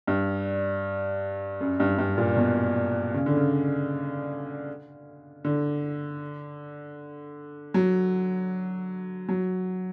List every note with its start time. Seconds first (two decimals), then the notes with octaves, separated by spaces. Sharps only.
0.07 G2
1.61 F#2
1.80 G2
1.98 G2
2.18 A#2
2.37 B2
3.14 C#3
3.26 D3
3.37 C#3
5.45 D3
7.74 F#3
9.29 F#3